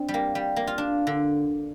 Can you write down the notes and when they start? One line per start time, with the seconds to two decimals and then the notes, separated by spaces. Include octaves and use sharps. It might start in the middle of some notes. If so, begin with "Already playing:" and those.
Already playing: C4 D4
0.08 G3
0.14 A#3
0.35 G3
0.56 A#3
0.67 F4
0.78 D4
1.07 D3